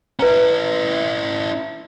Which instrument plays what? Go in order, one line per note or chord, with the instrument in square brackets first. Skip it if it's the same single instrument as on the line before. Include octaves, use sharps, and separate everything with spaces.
[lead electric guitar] C#4 E4 [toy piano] B4 A#5